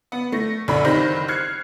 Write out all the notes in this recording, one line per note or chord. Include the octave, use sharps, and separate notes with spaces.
B3
A3 A#6
A#1 F#2 D3 B5
F#1 D#3 C4 G4 B5 A#6
F6 F#6 G#6 C7 C#7